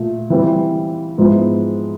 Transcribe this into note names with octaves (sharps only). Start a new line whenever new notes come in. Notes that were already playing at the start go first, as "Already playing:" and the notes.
Already playing: A#2 A3
E3 G3 C4
G#2 F3 G#3 B3 E4